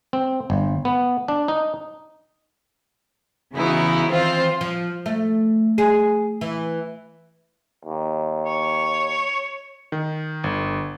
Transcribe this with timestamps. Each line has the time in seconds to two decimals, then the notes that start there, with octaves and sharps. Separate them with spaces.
0.13 C4
0.50 G1
0.85 B3
1.28 D4
1.48 D#4
3.54 C#3 E3 B3 D#4 E4 F#4
4.08 D#3 E3 C4 F4 C5
4.61 F3
5.06 A3
5.78 G#4
6.41 E3
7.85 D#2
8.45 C#5
9.92 D#3
10.44 G1